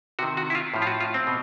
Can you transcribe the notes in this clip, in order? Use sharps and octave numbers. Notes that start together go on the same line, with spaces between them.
C3 D#3 F#4
F#4
E4
F4
A2 F3
F4
F#4
F4
C4
B2